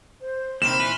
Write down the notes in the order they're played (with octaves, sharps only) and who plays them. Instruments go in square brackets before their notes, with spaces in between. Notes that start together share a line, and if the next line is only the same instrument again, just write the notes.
[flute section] C5
[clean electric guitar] D#2 C3 D#3 [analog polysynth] B5 C6 F6 [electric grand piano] E7
[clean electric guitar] A#2 E3 B4